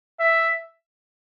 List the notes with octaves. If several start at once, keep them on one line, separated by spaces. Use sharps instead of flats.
E5